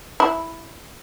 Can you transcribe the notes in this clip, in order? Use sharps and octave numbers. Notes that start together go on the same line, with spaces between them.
E4